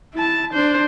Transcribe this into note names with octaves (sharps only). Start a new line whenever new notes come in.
E4 A5
D4 C5